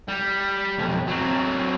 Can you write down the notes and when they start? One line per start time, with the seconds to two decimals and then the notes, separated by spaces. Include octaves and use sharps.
0.08 G3
0.78 B1 F2
1.07 F#3 C4